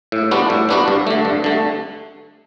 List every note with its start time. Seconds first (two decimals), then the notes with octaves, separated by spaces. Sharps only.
0.12 A2
0.31 G3 B3 D4 F#4
0.50 A2
0.69 G3 B3 D4 F#4
0.88 G2
1.07 D3 A3
1.25 G2
1.44 D3 A3